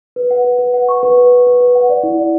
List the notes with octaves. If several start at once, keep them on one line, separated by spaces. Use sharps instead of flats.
B4
F#5
B4
B4
F#5
C#6
B4
B4
B4
B4
B4
F#5
D5
E4
D5